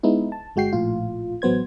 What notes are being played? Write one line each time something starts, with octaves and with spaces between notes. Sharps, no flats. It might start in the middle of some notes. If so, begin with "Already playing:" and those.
G#3 B3 D#4 E4
A5
G1 G#3 F#4 G5 C7
A#1 A2 F4
A1 F#3 B3 C5 G#6